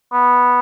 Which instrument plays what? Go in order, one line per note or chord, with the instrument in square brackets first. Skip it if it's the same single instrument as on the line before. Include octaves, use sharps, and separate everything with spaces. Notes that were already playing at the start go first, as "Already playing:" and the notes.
[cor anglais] B3